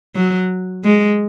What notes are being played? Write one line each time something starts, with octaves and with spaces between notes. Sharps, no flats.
F#3
G#3